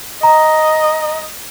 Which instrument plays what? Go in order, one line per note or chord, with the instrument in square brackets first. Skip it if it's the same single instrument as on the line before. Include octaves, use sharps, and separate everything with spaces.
[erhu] D#5 [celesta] A#5